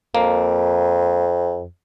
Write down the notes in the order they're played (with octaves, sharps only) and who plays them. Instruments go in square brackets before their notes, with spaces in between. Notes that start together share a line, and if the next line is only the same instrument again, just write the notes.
[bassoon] F2 [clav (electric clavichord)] A#3